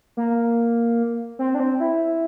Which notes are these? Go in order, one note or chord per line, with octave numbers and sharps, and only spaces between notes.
A#3
C4
D4
C4
E4